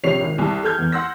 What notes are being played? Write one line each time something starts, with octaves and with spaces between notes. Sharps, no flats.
A#1 C3 C#5 C7 F7
G#1
C2 A5
A4 F6 G6 G#6
E2
F#5 C6 E6 A#6